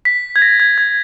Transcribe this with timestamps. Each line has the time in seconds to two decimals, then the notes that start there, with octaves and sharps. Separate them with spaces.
0.05 B6
0.36 G#6
0.42 A#6
0.60 G#6
0.78 G#6